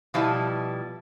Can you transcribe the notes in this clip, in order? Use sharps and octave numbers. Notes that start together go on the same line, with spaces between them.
B2 F3 G3 E4 A5